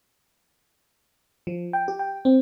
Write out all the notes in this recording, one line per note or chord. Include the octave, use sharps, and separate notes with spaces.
F3
G5
G4
G5
C4